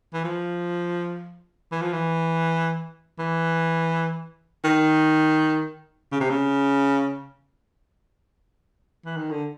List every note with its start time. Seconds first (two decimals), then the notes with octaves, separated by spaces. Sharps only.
0.13 E3
0.25 F3
1.72 E3
1.82 F3
1.93 E3
3.19 E3
4.64 D#3
6.12 C#3
6.20 C3
6.30 C#3
9.05 E3
9.17 D#3
9.31 D3